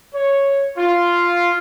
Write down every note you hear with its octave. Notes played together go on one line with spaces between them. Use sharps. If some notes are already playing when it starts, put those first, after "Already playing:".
C#5
F4